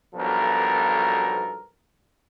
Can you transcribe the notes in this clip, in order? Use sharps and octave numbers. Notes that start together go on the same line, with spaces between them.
B1 G2 B2 F3 A4 A#4